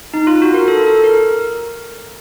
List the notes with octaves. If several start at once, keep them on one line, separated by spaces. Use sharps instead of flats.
D#4
F4
F#4
A#4
A4
A4
A#4